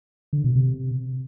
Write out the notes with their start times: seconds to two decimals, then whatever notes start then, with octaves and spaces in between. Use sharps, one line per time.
0.33 D3
0.44 B2
0.55 C3